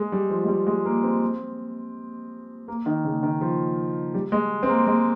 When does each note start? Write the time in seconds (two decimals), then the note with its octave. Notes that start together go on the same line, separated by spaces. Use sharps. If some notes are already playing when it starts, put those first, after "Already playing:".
Already playing: G#3
0.12 G3
0.30 F3
0.44 G#3
0.49 G3
0.67 G#3
0.85 A#3
1.04 C4
2.68 A#3
2.86 D#3
3.05 C#3
3.23 D#3
3.41 F3
4.14 G3
4.32 G#3
4.63 C4
4.69 A#3
4.87 G#3